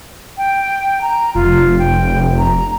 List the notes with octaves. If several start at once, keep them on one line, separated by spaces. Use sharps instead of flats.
G5
A#5
F1 F4
G5
A#5